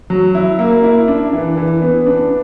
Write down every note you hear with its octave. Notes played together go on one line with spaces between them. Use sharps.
F#3
E4
A#3
E4
D4
E3
E3
B3
D4